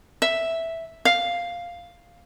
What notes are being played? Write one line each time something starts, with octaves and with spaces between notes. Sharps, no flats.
E5
F5